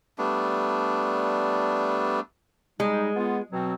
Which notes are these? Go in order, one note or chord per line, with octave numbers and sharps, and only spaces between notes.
G3 A3 B3 D4
G3 G#3 D#4
B3 F4
B2 F#3 C4